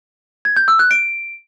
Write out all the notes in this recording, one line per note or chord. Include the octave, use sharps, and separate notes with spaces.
G#6
G6
E6
F#6
D7